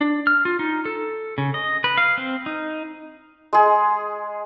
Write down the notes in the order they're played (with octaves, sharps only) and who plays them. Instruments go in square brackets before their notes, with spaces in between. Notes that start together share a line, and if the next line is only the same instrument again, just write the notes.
[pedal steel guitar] D4
F6
F4
D#4
A4
C#3
D#5
B4
F5
C4
D#4
[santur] G#3 G#4